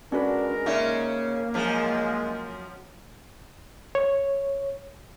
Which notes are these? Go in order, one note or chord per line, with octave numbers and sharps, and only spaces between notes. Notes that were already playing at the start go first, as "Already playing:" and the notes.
G#3 C#4 D4 F#4 A#4 B4
C#3 A#3 C#4 D#4 D5 E5
F#2 F3 G#3
C#5